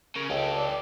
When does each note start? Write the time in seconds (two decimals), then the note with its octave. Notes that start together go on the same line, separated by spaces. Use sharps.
0.16 C#3 A#4
0.30 C#2 G4 A4
0.55 D5